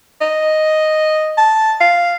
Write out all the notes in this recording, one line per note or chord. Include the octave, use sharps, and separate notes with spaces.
D#5
A5
F5